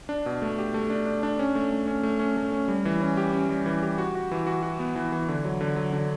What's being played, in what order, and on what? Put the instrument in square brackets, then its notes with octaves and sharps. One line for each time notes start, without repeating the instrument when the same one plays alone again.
[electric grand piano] D4
B2
A3
G4
A3
D4
D4
D4
C#4
A3
A3
C#4
A3
C#4
A3
C#4
G3
E3
C#4
G4
C#4
G3
E3
G4
F#4
F#4
E3
F#4
F#4
B3
E3
E3
D3
F#3
D3
F#3
D3